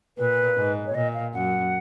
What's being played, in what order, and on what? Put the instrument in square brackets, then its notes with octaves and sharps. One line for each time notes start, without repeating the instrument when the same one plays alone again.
[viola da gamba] A#2 [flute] B4
[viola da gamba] G#2
[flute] C#5
[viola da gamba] A#2 [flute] D#5
[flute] F5
[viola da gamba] F#2 [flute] F#5